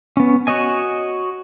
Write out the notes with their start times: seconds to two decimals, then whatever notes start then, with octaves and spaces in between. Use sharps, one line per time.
0.17 B3 C#4
0.47 F#4 C#5 D#5 G#5